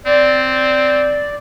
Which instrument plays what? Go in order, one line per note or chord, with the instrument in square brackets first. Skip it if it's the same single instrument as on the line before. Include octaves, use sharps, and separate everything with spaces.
[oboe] C4 [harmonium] D5